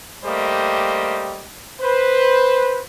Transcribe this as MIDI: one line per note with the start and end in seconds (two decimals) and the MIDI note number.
0.24 1.47 55
0.24 1.47 57
0.24 1.47 58
0.24 1.47 67
0.24 1.47 72
0.24 1.47 75
1.81 2.81 71
1.81 2.81 72